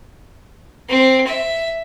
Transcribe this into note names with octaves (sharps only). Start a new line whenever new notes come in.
C4
E5